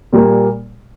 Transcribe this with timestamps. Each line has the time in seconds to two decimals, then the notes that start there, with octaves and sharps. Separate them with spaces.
0.13 A#2 G3 A#3